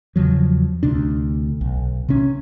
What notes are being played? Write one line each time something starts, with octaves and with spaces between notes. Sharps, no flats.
E2 C#3 F3 F#3
D2 C3 D4
B1
C3 C#4